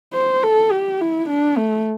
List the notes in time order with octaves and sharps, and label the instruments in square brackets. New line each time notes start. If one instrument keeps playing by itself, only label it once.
[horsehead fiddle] C5
A4
G4
E4
D4
A3